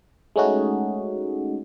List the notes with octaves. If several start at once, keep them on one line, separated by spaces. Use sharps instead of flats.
G#3 A3 C#4 D#4 F#4 G#4